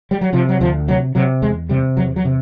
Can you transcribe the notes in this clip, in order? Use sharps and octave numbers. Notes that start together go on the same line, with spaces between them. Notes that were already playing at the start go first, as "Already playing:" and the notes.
G3
F#3
C3 F3
F#3
D2 F3
C3 F#3
C3 F#3
E2 G#3
C3 G3
E2 F#3
F#3
C3